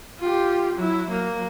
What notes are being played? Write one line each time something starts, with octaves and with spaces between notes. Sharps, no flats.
F4 G4
F#3 E4
F#3 A#3